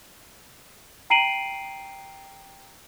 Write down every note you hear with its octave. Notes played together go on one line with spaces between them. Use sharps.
G5 A#5 C7 D7 D#7 F#7